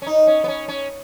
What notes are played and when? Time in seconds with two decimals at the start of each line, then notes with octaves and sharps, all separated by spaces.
0.02 C#4
0.07 D#4
0.27 C#4
0.44 B3
0.48 C#4
0.68 C#4